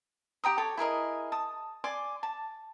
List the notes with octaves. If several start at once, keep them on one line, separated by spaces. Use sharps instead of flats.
G4 G5 A#5 D#6
A4 C#5 D6
E4 G#4 A#4 D#5
A5 D#6
D5 G#5 C6 D6
A5